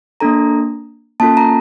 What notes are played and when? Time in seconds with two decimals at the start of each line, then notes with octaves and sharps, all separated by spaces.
0.20 A#3 D4 A4 A#5
1.20 A#3 C#4 F4 A4 A5
1.37 A#5